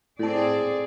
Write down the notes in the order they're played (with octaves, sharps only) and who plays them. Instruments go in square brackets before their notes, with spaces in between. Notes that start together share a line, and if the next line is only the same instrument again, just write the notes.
[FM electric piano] A2 A4 [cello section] C4 G#4 D5